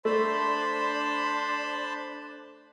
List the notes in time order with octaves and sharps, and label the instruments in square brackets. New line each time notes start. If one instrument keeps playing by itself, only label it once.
[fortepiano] A3 [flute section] D4 [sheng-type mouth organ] C5 A5 B5 [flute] C6